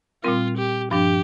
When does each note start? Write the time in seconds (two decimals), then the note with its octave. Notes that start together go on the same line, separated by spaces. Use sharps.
0.24 A#2 G3 C4 F4 A#4
0.58 G4
0.91 G2 F3 D4 G4